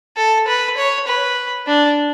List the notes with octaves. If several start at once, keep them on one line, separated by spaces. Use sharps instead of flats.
A4
B4
C#5
B4
D4